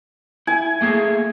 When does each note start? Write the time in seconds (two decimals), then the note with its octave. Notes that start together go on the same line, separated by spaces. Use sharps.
0.47 E4 G#5
0.81 A3 A#3 G#4